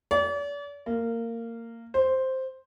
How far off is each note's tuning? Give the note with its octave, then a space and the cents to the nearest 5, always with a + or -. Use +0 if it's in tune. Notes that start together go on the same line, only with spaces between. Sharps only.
D5 -40
A#3 -20
C5 +0